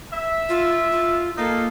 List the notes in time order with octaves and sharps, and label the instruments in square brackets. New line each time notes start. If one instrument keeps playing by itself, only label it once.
[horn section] E5
[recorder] F4
F4
[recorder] A#3 [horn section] D#4 F4 A4